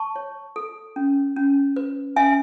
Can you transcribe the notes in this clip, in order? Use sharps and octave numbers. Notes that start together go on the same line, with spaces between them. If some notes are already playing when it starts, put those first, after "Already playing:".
Already playing: A5 C#6
C#5
A4
C#4
C#4
B4
C#4 E5 G#5